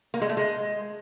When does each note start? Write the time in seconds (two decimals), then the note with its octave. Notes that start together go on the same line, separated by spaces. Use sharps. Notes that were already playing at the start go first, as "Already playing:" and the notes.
0.14 A#3
0.22 G#3
0.29 A3
0.37 G#3